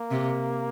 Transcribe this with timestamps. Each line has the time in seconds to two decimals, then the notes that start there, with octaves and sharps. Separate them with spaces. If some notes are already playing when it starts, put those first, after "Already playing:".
Already playing: A#3
0.11 C3